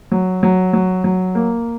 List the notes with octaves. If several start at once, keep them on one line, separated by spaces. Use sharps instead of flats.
F#3
F#3
F#3
F#3
A#3